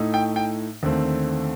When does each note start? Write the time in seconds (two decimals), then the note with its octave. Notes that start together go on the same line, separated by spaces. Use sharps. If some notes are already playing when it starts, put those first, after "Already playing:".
Already playing: A2 A3 D#4
0.14 G5
0.36 G5
0.83 D#2 D3 A3 C4